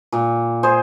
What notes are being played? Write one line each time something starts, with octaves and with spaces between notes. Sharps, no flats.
A#2
G#4 C5